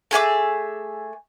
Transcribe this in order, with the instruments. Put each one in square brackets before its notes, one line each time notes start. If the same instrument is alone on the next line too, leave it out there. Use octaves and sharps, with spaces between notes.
[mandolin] A3 G#4 E5 D6